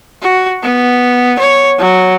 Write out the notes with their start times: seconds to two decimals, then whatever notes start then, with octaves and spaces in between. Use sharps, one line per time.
0.22 F#4
0.63 B3
1.39 C#5
1.79 F#3